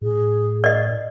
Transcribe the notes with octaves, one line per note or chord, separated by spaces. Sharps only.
A2 G#4
D5 D#5